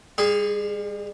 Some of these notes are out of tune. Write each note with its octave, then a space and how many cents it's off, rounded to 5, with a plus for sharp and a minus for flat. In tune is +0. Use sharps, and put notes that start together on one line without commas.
G3 +40 G#4 +0 C6 +0